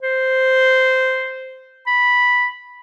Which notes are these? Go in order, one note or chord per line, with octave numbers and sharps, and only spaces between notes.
C5
B5